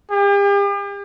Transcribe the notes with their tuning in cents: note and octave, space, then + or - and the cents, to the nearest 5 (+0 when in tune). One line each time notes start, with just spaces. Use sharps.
G4 +45